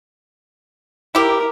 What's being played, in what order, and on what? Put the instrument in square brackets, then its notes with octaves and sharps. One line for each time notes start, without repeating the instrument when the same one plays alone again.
[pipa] E4 G4 [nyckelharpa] A#4